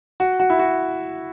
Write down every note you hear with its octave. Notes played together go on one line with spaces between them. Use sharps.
F#4
F#4
E4
F#4